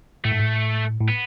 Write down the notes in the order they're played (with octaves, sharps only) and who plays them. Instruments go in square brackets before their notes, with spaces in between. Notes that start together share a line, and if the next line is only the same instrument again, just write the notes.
[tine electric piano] A2 [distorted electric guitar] A3
[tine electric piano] G#2
A2
A2
[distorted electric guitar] B3